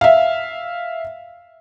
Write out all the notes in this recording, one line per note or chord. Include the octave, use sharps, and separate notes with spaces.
E5 F5